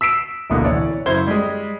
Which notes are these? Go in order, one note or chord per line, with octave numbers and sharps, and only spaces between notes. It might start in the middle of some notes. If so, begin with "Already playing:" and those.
E6 B6 C7 D7 E7
D1 A1 B2 D3 A#3
E3 C#5 D5
F#2 C#3 E4 C5 G#6 G7
G3 G#3